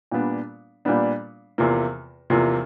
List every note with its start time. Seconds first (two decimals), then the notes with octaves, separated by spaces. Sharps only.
0.12 A#2 G3 B3 D4
0.85 A#2 G3 B3 D4
1.58 E2 C3 F3 A#3
2.30 E2 C3 F3 A#3